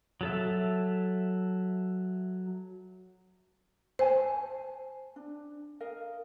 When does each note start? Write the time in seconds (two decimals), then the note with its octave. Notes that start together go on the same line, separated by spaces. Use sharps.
0.21 F#3 A4 E5
3.99 C5 C#5 G#5 A5
5.16 D4
5.80 A#4 D#5 F5